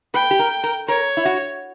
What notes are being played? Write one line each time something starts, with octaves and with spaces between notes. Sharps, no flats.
B4 G5
G4
A#4
A#4
A#4 C#5
E4
F#4